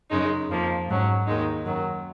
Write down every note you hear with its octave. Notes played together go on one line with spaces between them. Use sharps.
F#2 C#3 G#3 D#4
F2 F3 A#3
G#2 F#3 C#4
D#2 D#3 G#3 D#4
F#2 D#3 F#3